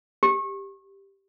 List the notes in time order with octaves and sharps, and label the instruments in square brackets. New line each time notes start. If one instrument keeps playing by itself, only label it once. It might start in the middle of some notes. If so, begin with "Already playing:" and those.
[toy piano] G4